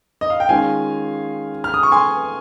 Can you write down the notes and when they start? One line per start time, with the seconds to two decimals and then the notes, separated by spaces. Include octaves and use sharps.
0.21 D#5
0.30 F5
0.40 G5
0.49 D#3 G#3 C#4 F4 F5 G#5
1.64 F6
1.74 D#6
1.83 C#6
1.92 G#5 C6